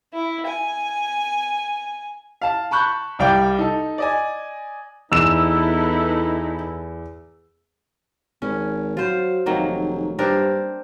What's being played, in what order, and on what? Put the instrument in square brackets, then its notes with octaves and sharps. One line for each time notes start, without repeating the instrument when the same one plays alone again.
[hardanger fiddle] E4
G#5
[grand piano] F5 A5
A5 B5 C#6 F#6 G6
C2 G3 D5 F5 G5
D#4 A4
D5 D#5 G#5
[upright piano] E2 [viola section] B3 E4 A4 [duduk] D#4 [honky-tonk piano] E6 E7
[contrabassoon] G#1 [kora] C#4
[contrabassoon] F#3 [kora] F4 C5
[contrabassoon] F1 [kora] D#3 F#3 A#3
[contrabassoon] G2 [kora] C4 D4 A#4